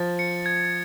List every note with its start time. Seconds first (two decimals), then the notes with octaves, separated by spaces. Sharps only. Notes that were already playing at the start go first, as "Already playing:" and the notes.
Already playing: F3 A6
0.19 C#7
0.46 G#6